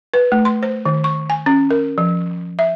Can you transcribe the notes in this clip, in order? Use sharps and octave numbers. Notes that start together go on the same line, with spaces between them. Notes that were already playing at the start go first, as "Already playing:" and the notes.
B4
A3
C6
C5
D#3
C#6
G#5
C#4
A#4
F3
E5